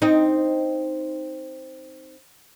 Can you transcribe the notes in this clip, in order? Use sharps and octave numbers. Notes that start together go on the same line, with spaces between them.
C4 D#4